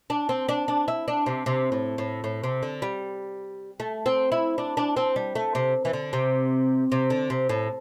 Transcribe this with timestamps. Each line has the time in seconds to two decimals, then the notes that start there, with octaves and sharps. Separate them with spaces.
0.10 D4
0.29 C4
0.49 D4
0.68 D4
0.88 E4
1.08 D4
1.26 C3
1.46 C3
1.72 A2
1.98 A2
2.24 A2
2.44 C3
2.63 D3
2.82 G3
3.80 A3
4.06 C4
4.32 E4
4.58 D4
4.77 D4
4.97 C4
5.16 G3
5.35 A3
5.55 C3
5.85 E3
5.93 D3
6.13 C3
6.92 C3
7.10 D3
7.30 C3
7.49 A2